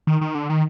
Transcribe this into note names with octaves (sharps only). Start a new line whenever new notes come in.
D#3
D#3
D3
D#3